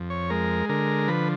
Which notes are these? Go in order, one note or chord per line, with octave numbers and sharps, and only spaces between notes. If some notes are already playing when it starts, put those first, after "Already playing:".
Already playing: F2
C#5
G#3 A#4
D3 A#4
F3 B4